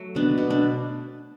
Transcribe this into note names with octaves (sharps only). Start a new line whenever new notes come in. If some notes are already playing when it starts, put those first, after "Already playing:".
Already playing: F#3 A3
B2 B3 D4
B2
D4